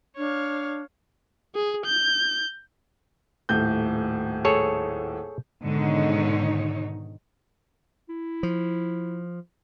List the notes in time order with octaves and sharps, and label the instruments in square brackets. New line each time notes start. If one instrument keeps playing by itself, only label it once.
[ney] D4 [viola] C#5 F5
[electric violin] G#4
G6
[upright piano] D#1 A2 G6
[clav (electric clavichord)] G#4 A4 C#5
[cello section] G#2 B2 D3 D#3 D#4 C#5
[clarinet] E4
[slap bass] F3